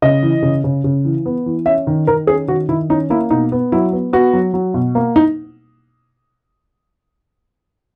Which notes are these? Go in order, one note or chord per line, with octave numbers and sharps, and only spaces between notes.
C#3 D#5
E3
C#3
C#3
C#3
E3
B3
E3
C#4 E5
D#3
D#3 A#4
C#4 G#4
D#3 F#4
D#3 E4
C#4 D#4
A#3 E4
B2 D#4
B3
F#3 E4
B3
B3 F#4
F#3
F#3
B2
A#3
D#4